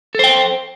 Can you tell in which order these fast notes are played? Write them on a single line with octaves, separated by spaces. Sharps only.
A4 C5 G5